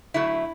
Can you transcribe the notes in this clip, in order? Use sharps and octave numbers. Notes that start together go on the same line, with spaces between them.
D3 F#3 A3 E4